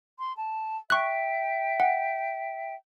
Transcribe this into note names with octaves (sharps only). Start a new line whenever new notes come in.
C6
A5
E5 G5 C#6 F#6
F#5